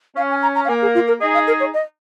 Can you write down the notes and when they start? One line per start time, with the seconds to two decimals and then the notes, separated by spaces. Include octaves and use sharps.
0.16 C#4 F5
0.30 G#5
0.42 A#5
0.55 A#5
0.65 F5
0.68 A#3 G#5
0.82 G#4
0.95 F4
1.08 A#4
1.21 D#4 G#4 D#5
1.34 F5
1.47 A#4
1.60 C#5
1.74 D#5